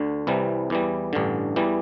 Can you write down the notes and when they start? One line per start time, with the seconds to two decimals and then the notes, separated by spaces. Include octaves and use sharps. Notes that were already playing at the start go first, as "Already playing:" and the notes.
Already playing: D2 D3
0.27 C2 C3 E3 G3
0.70 E2 E3 G3
1.13 A1 G2 D3
1.56 E2 E3 G3